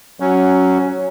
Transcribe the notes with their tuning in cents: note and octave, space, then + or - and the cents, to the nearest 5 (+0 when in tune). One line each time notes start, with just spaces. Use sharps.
F#3 +10 C#4 +0